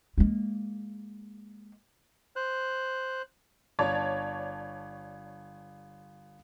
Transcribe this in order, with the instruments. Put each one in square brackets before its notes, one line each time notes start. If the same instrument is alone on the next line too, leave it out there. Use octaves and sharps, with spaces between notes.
[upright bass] G#3 A#3
[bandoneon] C5 F#6
[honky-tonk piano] G1 C#5 D5 A5